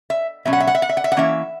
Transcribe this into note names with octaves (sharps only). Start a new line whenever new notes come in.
E5
B2 F#3 C#4 E5
F#5
E5
F#5
E5
F#5
E5
F#5
E5
F#5
E3 A#3 C#4 E5